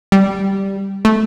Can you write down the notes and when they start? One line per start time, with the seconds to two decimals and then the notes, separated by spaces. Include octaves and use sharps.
0.12 G3
1.05 A3